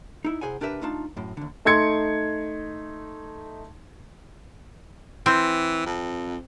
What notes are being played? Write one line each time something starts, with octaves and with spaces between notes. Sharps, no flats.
D#4 E4
C3 E4 G#4 C5 F#5 G#5
C2 D4 G4 A#4 B4 E5
A3 D4 D#4 F4 A5
F#2 A2
D#2 D3
A3 D#4 C6 G#6 C#7
E3 C4
F2